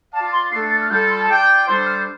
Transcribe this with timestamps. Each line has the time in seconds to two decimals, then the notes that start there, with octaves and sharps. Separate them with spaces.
0.13 F4 D5 F5 A5
0.32 C6
0.52 A3 D4 A4 C7
0.71 A6
0.81 F6
0.90 G3 F4 A4 G6
1.09 C6
1.20 A5
1.29 F4 D5 G5
1.67 G3 D4 A4 C5 C6
1.86 F6